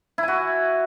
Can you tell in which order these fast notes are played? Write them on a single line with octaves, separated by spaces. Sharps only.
E4 G#5 F#4